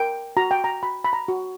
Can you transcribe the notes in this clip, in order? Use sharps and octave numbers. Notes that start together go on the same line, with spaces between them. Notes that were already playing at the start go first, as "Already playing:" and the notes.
Already playing: A#4 G5
F#4 A#5
G5
A#5
F#4 B5
B5
A#5
F#4